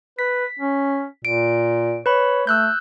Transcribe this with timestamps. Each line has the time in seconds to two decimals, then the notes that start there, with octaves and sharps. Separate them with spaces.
0.19 B4 B6
0.59 C#4
1.25 A#2 D7
2.06 B4 C#5 B5
2.47 A3 E6 F#6 G6